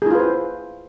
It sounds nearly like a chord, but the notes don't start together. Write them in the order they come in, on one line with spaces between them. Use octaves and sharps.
G#4 E4 F4 B4 C5